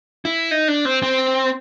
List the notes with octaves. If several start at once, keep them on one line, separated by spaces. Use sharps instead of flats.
E4
D#4
D4
C4
C4